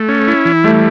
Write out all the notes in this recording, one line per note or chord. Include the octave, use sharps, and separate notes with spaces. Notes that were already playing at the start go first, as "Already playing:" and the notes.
Already playing: A3
C#4
E4
E3
G3 A3